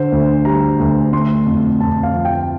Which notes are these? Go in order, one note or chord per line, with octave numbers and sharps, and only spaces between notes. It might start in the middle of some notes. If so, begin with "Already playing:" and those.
Already playing: D3 C5
D2
G3 A#5
D2
A3 C6
F2
F2 A5
F5
F3
G5